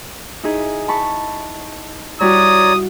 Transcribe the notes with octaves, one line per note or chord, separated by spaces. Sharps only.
D#4 E4 G#4
A5 B5 C#6
G3 E4 F#4 C#5 D5 A#5 D#6